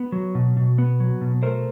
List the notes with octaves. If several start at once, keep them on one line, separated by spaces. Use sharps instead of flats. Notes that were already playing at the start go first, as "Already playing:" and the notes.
Already playing: B3
F#3
B2
B2
B3
F#3
B2
A3 A#4 C5